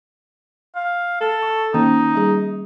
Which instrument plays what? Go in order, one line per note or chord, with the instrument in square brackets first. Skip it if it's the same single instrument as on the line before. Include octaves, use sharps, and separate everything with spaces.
[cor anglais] F5
A4
[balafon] C#6
[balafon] D#3 A#3 C#4 [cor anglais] D#4
[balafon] G3 G#4